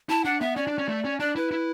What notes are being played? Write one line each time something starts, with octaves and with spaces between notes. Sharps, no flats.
E4 A5
D4 F#5
B3 E5
C#4 D5
D4
C#4
A3
C#4
D4 D5
E4 B4
E4